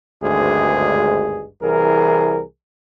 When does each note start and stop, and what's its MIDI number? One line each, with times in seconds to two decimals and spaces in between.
0.22 1.46 32
0.22 1.46 38
0.22 1.46 43
0.22 1.46 56
0.22 1.46 68
1.61 2.41 36
1.61 2.41 52
1.61 2.41 68
1.61 2.41 70